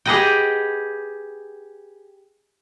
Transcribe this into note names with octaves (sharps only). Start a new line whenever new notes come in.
G4 G#4 B4 D#5 F#5 G5